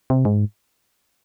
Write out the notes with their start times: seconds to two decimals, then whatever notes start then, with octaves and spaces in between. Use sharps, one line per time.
0.10 C3
0.25 G#2